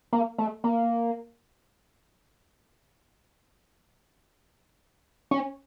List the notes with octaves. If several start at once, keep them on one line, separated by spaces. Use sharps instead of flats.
A#3
A3
A#3
C#4